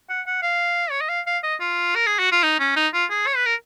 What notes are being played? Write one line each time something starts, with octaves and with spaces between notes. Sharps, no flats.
F#5
F#5
F5
C#5
D#5
F5
F5
D#5
F4
A#4
G#4
F#4
F4
D#4
C#4
D#4
F4
G#4
C#5
B4
A#4